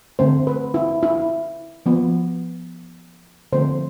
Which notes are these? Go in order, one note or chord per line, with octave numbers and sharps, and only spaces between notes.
D3 A3 C4 C5
B4
E4
E4
F3 B3
D3 F3 A3 C4 C5